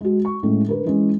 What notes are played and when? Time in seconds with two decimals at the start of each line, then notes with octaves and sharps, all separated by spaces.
0.01 G#3 F#4
0.25 C#6
0.43 A2 G#3 C#4
0.66 D3 A#4 B4
0.85 E3 G#3 C#4